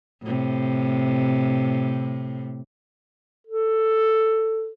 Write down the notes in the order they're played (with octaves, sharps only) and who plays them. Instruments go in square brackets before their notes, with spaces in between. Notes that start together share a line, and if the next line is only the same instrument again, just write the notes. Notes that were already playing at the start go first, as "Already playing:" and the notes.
[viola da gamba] A2 C3
[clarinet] A4